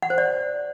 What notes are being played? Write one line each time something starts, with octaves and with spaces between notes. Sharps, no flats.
F#5
C5
D5